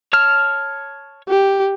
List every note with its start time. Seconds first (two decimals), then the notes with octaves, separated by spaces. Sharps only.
0.13 C#5 A5 F6
1.29 G4